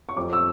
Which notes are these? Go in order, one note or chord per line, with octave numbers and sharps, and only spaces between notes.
C#6
F2 D6
E6